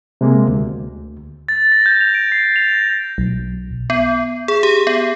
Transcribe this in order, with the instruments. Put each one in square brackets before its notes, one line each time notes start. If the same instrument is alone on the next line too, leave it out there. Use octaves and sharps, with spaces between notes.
[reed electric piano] C3 G#3 A#3
D2
[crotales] A6
A#6
G6
F7
D7
C7
F7
A#6
[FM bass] B1
[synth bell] B3
G#4
G4
B3